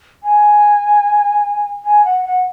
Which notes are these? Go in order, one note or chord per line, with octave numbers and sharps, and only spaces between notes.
G#5
G#5
F#5
F#5